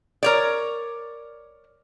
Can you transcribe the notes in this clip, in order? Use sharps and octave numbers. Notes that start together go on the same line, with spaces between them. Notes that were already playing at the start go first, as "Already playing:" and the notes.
A#4 C#5 D5